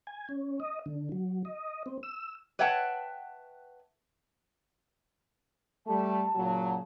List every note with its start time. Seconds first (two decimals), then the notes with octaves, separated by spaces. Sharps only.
0.07 G#5
0.29 C#4
0.60 D#5
0.86 D3
1.12 F#3
1.45 D#5
1.86 C4
2.03 E6
2.59 B4 C#5 E5 F#5 G5 A5
5.87 G3 A3 A5
6.35 A#2 C#3 F#3